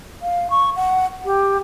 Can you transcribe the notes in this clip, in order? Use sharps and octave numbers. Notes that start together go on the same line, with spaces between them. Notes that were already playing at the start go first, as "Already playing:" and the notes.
F5
C#6
F#5
G4